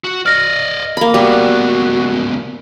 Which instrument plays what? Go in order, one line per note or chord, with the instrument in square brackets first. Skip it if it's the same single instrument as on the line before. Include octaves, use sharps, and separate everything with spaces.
[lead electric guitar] F#4
[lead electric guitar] D5 D#5 [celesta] F6 A#6
[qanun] A#3 B5
[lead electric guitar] C#2 B3 [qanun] G3 [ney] F#4 [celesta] D5